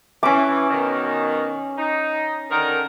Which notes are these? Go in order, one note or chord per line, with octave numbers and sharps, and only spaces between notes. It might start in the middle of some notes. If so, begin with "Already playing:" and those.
E3 C#4 D6
B2 D#3
D#4
D3 D#3 A#4